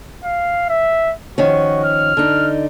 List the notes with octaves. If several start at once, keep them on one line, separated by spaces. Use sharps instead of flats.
F5
E5
D#3 F3 C#4 F#4
F6
D3 D#4